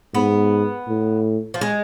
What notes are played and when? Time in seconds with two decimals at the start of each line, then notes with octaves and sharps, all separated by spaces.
0.14 G#2 B3
0.88 A2
1.54 F3
1.61 G#3